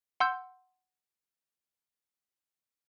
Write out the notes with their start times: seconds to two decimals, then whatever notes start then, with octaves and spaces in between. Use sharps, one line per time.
0.20 F#5 C6 E6 G6